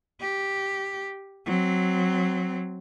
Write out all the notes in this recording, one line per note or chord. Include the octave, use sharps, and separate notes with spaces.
G4
F#3 C4